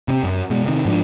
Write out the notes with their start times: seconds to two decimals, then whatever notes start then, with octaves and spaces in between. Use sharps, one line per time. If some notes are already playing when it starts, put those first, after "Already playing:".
0.08 C3 C4
0.23 F#2
0.50 B2 G#3
0.64 C3 D#3
0.85 G#2 F3 B3 D4